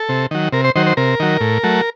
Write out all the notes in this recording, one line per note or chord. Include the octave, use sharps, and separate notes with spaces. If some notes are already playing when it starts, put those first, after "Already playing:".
Already playing: A4
C3
D#3 F#3
C3 A#4
C5
D#3 F#3 C5
C5
C3 A#4
D#3 F#3
A2
F#3 A3